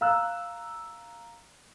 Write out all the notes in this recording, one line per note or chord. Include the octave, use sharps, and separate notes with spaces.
F5 A#5 E6 F#6